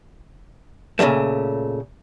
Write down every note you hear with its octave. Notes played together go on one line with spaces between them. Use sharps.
A#2 C#3 E3 F#3 A3